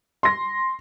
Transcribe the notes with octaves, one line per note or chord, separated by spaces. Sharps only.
C6 A#6